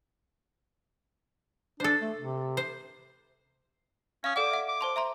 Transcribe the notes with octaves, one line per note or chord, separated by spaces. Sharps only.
D4 A4 C5
A3
C3
C5
C#4 F5 D#6
A4 D5 F#5 D6
E5 F#5
D6
C5 A5 C6
E5 A#5 C6